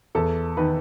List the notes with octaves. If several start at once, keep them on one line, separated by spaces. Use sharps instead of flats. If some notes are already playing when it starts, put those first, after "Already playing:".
E2 A4
D#3 B4